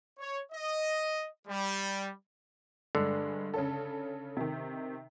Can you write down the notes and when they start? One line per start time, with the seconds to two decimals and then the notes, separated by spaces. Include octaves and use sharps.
0.18 C#5
0.52 D#5
1.48 G3
2.95 G2 D3 G#3
3.54 C#3 C#4 A4
4.37 C3 D#3